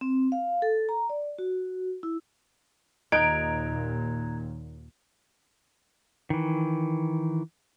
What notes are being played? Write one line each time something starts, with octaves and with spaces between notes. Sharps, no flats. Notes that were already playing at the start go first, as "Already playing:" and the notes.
C4
F5
A4
A#5
D5
F#4
E4
D#2 A#2 D#4 A#5 F#6 G#6 D7
D#3 E3